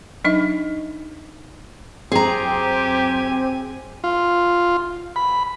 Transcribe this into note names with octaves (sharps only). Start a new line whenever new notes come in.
F#3 D4 D#4 D#5
F#2 C4 G4 G#4 G#5 A#5
F4
B5